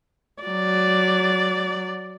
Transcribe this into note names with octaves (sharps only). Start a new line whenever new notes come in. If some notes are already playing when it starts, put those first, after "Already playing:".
F#3 D5